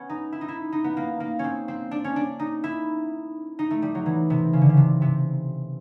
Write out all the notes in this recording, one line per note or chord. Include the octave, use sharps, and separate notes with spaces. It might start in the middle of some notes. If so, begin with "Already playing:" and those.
Already playing: B3 C#4
D#4
E4
D#4
E4
D#4
B3
A#3
A#3
C4 C#4
C4
D4
C#4
D4
D#4
E4
D#4
A3
G3
F#3
E3
C3
C#3
D3
C#3
C3
C3